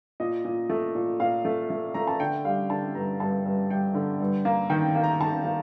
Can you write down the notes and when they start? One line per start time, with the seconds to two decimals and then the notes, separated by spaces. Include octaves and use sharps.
0.20 A#2 D#5
0.45 A#2
0.70 A3
0.95 A#2
1.20 A#2 F5
1.45 A3
1.70 A3
1.94 A3 A#5
2.07 A5
2.20 D3 G5
2.45 G3 F5
2.70 D3 A5
2.95 G2 A#5
3.20 G2 A5
3.45 G2
3.70 G3 G5
3.95 D3
4.20 G2
4.45 A#3
4.70 D#3 G5
4.95 A#3
5.04 A#5
5.20 D#3 A5
5.45 A#3